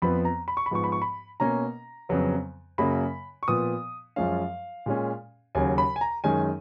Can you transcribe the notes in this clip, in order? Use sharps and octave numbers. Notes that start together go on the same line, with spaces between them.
F2 F3 B3 B5
A#5
B5
C#6
B5
G#2 F3 B3 C#6
B5
C#6
B5
B2 A#3 C#4 A#5
F2 C#3 F#3 B3
F#2 C#3 F#3 A#3 B5
C#6
A#2 F3 B3 D#6
F#2 F3 G#3 C#4 F5
A#2 G#3 C#4
D#2 C#3 F#3 G#5
B5
G#5
A#5
F#2 D#3 G#3 C#4 G#5